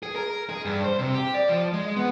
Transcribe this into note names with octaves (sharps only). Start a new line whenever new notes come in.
G#4
A#4
G#4
G2
C5
C3
G4
D5
F3
G#3
B3